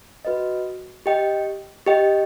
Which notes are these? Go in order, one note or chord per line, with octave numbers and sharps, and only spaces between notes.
F#4 B4 D#5
G4 D#5 G5
G4 D#5 G5